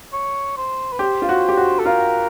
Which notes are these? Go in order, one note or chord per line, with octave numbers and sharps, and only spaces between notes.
C#5
C5
B4
G4 C5
F4
F#4
G4
F#4
A4
F4 A#4